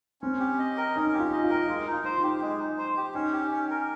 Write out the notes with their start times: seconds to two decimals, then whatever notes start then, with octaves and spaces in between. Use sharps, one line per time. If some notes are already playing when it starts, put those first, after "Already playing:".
0.22 C4 C#4
0.40 G4
0.59 D#5
0.77 A#4
0.95 C#4 D#4
1.13 G4
1.20 F4
1.32 D#5
1.43 F4
1.50 A#4
1.68 G#3 F4
1.87 D#4
1.93 F4
2.05 C5
2.17 D#4
2.23 G4
2.42 G#3
2.59 D#4
2.78 C5
2.97 G4
3.14 C#4 D#4
3.32 G4
3.51 C#4
3.70 A#4